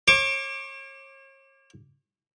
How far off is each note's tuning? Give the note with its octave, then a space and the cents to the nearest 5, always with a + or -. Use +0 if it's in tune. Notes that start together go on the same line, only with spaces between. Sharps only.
C#5 -40 D6 +0